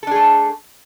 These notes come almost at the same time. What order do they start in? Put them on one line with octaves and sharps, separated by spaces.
A4 D4 G#4 A3